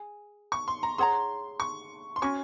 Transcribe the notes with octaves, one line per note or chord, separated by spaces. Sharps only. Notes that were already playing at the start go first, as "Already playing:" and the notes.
Already playing: G#4 G#5
C#6
C6
A#5
G#4 C#5 F#5 A#5 C6
C#6
C6
C#4 F#4 C#5 G#5 C#6